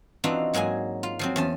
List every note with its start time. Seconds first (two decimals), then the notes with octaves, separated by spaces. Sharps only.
0.24 E3 C4 D4 D#4 F4 F#4
0.53 G#2 F#3 A#3 G#4 G#5
1.03 F4
1.19 F3 F#3 C4
1.36 E2 C#4 A5